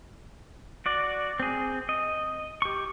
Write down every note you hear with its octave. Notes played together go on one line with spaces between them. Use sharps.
F#4 D5
C4 G#4
D#5
G4 C#6